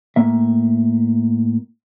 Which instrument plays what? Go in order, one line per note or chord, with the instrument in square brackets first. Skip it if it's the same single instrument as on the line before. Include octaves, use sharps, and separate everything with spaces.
[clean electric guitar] A2 A#3 E5